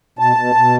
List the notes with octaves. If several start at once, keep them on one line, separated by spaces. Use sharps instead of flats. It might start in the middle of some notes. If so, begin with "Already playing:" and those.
B2 A5
B2
B2